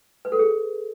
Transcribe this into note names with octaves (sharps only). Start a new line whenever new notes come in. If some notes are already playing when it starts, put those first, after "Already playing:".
B4
A4
G#4